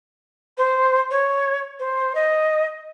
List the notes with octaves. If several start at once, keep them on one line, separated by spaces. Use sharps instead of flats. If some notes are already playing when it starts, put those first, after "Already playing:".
C5
C#5
C5
D#5